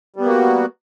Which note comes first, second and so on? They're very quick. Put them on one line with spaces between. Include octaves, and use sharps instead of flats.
G3 B3 A#3 F#4